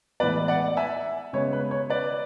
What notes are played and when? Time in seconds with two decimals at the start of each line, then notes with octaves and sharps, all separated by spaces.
0.20 A2 E3 G#3 B3 B4 D5
0.48 D5 F#5
0.77 E5 G#5
1.33 C#3 G#3 B3 C#5
1.53 B4
1.71 C#5
1.90 B4 D5